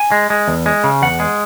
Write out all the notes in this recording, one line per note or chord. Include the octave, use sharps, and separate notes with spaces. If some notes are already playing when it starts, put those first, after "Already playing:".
Already playing: G#5
G#3
G#3
E2
G#3
C#3
E2 F#5
G#3